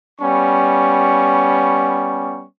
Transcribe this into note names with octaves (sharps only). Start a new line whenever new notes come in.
G3 B3 C#4 C#6